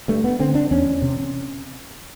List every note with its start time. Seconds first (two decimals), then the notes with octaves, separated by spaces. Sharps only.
0.08 G2 A3
0.24 B3
0.39 D3 C4
0.55 D4
0.71 E2 C#4
1.02 C3